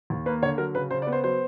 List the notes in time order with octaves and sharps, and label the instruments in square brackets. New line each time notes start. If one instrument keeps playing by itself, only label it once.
[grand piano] D#2
A#3 B4
D3 C#5
F#3 A#4
C#3 B4
C#3 C5
D5
B3
C5
F#3 C5